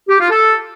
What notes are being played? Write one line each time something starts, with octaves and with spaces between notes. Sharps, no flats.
G4
F4
A4